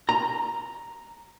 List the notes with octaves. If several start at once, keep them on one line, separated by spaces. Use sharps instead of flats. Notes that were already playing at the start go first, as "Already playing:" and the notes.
A#5